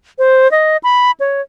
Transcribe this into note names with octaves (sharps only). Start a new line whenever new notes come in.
C5
D#5
B5
C#5